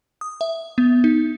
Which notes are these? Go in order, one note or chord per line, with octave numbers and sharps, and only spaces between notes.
D#6
E5
B3
D#4